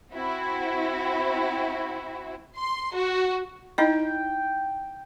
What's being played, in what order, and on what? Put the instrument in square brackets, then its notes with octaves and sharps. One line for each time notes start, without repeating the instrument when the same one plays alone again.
[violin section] C4 E4 F#4
C6
F#4
[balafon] D#4 E4 D#5 [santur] G5